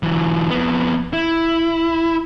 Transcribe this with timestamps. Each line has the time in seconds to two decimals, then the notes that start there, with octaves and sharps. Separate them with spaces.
0.03 E3 F#3
0.50 F2 B3
1.13 E4